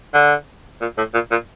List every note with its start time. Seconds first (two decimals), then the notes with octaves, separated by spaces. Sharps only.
0.14 D3
0.81 A#2
0.98 A2
1.14 A#2
1.31 A#2